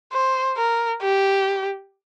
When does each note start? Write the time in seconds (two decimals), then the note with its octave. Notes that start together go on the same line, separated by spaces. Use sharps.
0.13 C5
0.57 A#4
1.03 G4